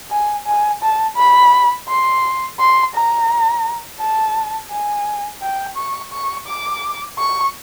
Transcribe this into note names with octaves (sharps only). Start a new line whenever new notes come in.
G#5
G#5
A5
B5
C6
C6
A#5
A5
G#5
G5
C#6
C#6
D6
C#6